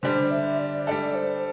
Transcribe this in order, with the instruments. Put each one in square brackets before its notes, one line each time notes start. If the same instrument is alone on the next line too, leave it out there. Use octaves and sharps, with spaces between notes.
[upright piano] D3 G3 D4 [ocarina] C5
[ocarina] E5
D5
[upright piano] G3 D4 A4 [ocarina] D5 E5
[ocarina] C5